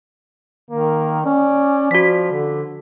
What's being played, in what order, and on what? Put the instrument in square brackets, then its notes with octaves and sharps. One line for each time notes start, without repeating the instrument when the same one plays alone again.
[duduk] D#3 [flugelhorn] A#3
[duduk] C#4 [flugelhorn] D5
[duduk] F3 [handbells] F#4 B6
[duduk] D3